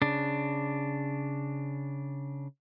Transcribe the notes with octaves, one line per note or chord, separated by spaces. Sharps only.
C#3 D4